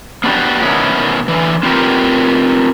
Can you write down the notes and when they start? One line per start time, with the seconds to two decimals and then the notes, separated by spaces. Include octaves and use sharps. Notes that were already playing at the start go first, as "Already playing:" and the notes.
0.24 B3 C#4 D4 E4 F#4 G4
0.62 B2 D#3 B3 C#4 E4
1.28 D3 E3
1.63 C4 F4 G4 A#4 B4